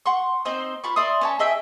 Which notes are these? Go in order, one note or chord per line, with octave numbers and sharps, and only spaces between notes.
F#5 C6 C#6
C4 D#4 C5 D#6
F4 B5 C#6
D5 E5 C6 D#6
C#4 C#5 A5
G#4 D#5 E5 G5